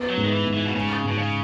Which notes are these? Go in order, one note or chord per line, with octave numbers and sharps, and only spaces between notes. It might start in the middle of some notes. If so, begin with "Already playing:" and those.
Already playing: B3
F#3
G#2
D#3
E3
G#2
E3
B2
C#3 G#3
G#2 B2
C#3